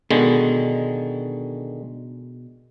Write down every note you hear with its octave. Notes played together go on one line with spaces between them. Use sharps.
B2 D3 D#3 G#3